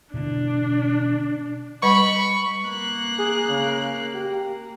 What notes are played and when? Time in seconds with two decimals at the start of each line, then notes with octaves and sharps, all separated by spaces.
0.14 B2 D3 E3 D4
1.83 G3 B4 D#5 B5 C#6
2.68 A#3 F#6
3.19 G#4
3.48 C#3
4.14 G4